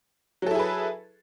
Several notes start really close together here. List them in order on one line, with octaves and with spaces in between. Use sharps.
F#3 A4 E4 G#4 B4